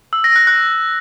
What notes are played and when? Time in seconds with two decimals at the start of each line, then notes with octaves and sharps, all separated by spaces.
0.13 E6
0.24 A#6
0.36 F#6
0.47 F#6